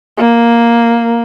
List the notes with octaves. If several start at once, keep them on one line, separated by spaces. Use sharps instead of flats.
A#3